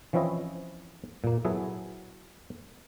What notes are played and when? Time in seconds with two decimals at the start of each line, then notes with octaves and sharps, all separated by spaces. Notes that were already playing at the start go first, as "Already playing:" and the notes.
0.13 E3 F3 C4 C#4 E4 D#5
1.24 A#2 A#3
1.45 F#3 B3 E4 G#4 A4 B4